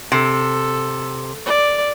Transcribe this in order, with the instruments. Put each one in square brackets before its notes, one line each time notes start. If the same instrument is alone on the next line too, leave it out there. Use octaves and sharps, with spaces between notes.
[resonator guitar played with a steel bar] C3 [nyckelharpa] A4
[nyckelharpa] D5